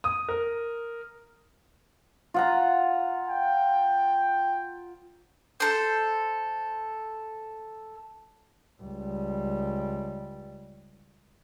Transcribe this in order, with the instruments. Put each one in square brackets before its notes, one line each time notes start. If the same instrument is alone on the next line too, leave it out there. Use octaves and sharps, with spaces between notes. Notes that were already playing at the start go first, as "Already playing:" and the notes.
[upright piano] D#6
A#4
[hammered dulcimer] F4 F#5 A#5
[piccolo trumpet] G5
[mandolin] A4 C5
[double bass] C#2 G3